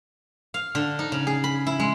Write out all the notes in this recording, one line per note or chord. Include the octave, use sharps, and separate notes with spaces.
F5
D3
D#4
C#3
G#4
B5
E4
G#3